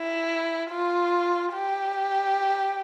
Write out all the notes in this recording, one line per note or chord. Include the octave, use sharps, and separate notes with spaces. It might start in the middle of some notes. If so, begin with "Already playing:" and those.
Already playing: E4
F4
G4